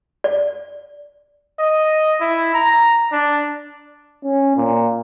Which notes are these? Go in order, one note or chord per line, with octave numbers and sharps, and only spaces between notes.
D5
D#5
E4
A#5
D4
C#4
A#2